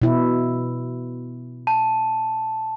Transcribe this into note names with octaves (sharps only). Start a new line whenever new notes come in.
B2 E4
A5